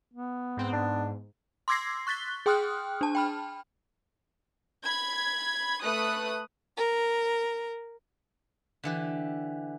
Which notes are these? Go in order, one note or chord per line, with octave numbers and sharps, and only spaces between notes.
B3
G#2 C4
G#2 D4
C6 D6 E6 G#6 A#6 C7
C#6 F#6 A6 B6 G7
G#4 G5 C6 D#6 F6 F#6
D4 A5
G5 B5 F6
B5 G#6
A3 B4 D#6 F#6
A#4
D3 E3 G4